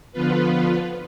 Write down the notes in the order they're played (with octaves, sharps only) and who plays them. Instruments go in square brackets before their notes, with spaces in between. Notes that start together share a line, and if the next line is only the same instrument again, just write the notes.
[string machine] D3 F3 B3 F4 B4